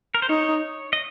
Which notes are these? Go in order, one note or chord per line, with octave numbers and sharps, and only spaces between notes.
A#4
C5
D#4 C#5
D#5